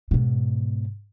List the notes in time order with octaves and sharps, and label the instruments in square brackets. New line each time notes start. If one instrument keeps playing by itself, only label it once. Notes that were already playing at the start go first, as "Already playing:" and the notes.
[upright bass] G#2 B2